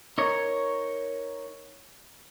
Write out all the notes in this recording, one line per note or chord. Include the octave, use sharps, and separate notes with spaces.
D#4 A#4 C#5